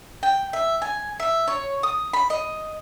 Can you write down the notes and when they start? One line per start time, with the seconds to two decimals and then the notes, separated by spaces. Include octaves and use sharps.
0.23 G5
0.53 E5
0.82 G#5
1.20 E5
1.48 C#5
1.83 D#6
2.13 B5
2.30 D#5